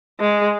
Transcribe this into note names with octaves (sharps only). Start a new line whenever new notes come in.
G#3